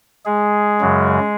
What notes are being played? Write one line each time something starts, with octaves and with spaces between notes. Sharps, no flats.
G#3 G#4
F#2 C#3 F#3